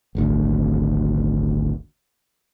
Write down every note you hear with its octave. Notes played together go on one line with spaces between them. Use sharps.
D#1 G#1 D2